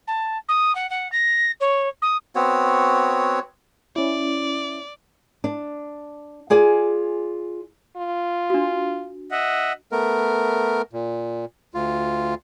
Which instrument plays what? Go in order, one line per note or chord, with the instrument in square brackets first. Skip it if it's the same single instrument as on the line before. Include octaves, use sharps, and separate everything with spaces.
[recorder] A5
D#6
F#5
F#5
A#6
C#5
D#6
[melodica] B3 C4 F#4 C#5
[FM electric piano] C#4 E4 [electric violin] D5
[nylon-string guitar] D4
F4 G#4 D5 G#5
[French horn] F4
[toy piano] D4 F#4
[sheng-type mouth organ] D#5 E5 F#5
[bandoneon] A3 B3 A#4
A#2
D2 F4